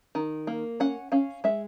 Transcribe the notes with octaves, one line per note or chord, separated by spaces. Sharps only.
D#3
A#3
C#4 F#5
C#4 F5
G#3 E5